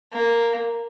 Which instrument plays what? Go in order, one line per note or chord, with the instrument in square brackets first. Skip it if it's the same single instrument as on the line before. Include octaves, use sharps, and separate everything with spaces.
[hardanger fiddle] A#3